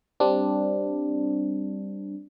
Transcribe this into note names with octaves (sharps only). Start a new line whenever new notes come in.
G3 C4 D4